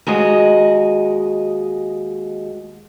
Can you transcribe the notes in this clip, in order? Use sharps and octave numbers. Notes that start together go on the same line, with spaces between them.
D#2 G#3 F#4 D#5